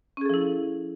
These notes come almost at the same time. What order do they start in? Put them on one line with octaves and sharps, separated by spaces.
C#4 G#4 A4 F3 E4